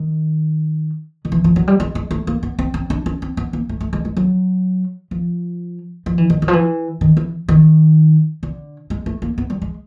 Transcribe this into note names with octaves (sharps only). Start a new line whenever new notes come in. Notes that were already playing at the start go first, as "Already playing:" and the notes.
Already playing: D#3
D#3
E3
F3
F#3
G3
G#3
G#3
A3
A#3
B3
C4
C4
D4
C#4
C4
B3
A#3
A3
A3
G#3
G#3
F#3
F3
F3
E3
D#3
D#3
F3
E3
D#3
E3
D#3
D3
G#3
A3
A#3
B3
G3
G#3